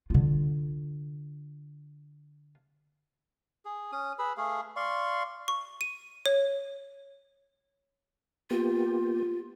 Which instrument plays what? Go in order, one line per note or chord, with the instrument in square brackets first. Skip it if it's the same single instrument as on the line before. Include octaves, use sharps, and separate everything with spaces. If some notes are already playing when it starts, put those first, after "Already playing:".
[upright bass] D3 F4
[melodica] G#4
C#4 D#6
G#4 B4 B5 E6
A3 G#4 F5
D5 F5 C6 C#6
[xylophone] C#6
D#7
C#5
[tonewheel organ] A#3 B3 G4 [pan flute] F4